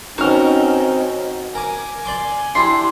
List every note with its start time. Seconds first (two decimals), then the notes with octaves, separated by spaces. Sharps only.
0.18 B2 C4 C#4 D#4 F#4 A#4 F6
1.55 A#4 G#5 D6
2.05 D5 C6 D6
2.55 D4 E4 G4 C6